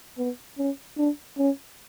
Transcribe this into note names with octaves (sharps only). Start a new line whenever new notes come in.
B3
C#4
D4
C#4